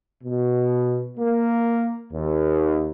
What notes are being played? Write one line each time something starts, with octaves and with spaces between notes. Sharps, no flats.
B2
A#3
D#2